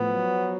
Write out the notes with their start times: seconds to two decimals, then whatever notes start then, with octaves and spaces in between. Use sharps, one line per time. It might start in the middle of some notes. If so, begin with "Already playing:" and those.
Already playing: A2 F3 B3
0.09 F#3